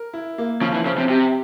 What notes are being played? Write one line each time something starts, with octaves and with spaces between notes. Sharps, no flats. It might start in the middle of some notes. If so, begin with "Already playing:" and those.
Already playing: A#4
E4
A#3
C#3 F3
E3
C#3 C5
C3
C3 G4